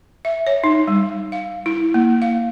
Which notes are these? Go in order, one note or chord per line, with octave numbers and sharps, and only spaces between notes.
E5
C#5
D#4
G3
F5
E4
A#3
F5